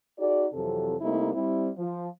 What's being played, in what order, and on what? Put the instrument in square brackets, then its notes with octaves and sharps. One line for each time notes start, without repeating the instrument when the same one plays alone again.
[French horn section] D#4 F#4 G#4 D5
F2 C3 E3 F#3 A4
C3 G3 A3 A#3 D#4 E4
G3 C4 E4
F3